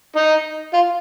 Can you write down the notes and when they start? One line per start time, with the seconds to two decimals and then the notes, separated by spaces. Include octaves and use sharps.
0.16 D#4
0.73 F4